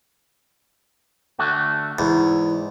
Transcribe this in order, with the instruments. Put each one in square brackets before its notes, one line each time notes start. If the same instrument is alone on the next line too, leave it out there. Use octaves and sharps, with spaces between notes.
[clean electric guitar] D3 A3 F#4
[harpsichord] E2 [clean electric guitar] G#2